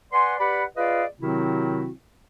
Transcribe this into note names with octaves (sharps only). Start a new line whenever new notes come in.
B4 D5 F#5 G#5 C6
G4 B4 D5 F#5 B5
F4 G#4 B4 D5 D#5 F5
C3 D#3 F#3 C4 E4 F#4